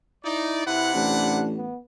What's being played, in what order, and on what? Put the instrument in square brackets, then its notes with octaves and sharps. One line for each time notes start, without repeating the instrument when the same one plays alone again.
[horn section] D#4 D5 [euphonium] E4
[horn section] C3 B4 F#5 [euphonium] E4
[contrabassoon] A1 [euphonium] D4
[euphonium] B3